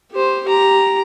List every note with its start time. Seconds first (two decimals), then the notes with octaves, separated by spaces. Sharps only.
0.11 G4 C5
0.45 G4 A#5